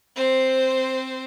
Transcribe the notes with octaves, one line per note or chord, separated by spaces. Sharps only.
C4 C5